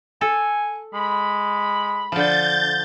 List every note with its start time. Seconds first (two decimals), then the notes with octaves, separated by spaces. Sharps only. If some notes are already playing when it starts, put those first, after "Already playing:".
0.21 A4 G#5
0.94 G#3 B5
2.12 D3 F3 G6 A6